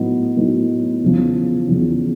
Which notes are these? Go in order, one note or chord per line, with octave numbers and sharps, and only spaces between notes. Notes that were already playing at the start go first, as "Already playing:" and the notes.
Already playing: A2 F#3 B3 D#4
A2 F#3 B3 D#4
E2 C#3 F3
E2 C#3 F3